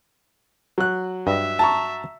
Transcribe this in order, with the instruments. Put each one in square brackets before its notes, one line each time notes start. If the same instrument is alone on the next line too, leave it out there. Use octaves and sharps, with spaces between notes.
[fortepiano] F#3 F#6
[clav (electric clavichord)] G2 D#5 [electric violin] E5
[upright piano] A5 A#5 C#6